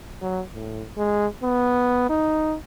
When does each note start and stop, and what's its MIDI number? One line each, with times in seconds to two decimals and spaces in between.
0.22 0.43 54
0.55 0.83 45
0.98 1.26 56
1.43 2.05 59
2.10 2.56 63